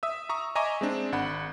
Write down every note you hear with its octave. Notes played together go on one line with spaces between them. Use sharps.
E5 D#6 E6
A#5 C#6 D#6
D#5 E5 G#5 A#5 C#6 D6
G#3 C4 D4
G#1 F#5 B5